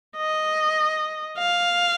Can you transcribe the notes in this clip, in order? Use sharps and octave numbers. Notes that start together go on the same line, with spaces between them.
D#5
F5